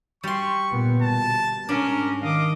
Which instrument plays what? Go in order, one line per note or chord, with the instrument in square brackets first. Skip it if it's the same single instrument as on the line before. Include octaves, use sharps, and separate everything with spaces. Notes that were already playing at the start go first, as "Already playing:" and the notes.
[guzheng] G3 C6 [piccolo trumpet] C#6
[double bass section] G1 A#2 B3
[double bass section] B2 [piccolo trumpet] A5
[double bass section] G#2 [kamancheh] C#4 [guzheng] D4 [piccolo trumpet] A#4
[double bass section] D#3 [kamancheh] D#5 D6 [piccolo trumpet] F5